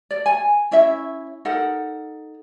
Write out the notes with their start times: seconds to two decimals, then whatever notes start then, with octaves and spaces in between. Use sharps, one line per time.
0.11 D5
0.26 G#5
0.71 C#4 E4 C#5 E5
1.45 D#4 A4 A#4 F#5